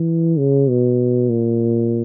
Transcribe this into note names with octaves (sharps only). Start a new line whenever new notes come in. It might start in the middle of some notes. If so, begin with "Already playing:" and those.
Already playing: E3
C#3
B2
A#2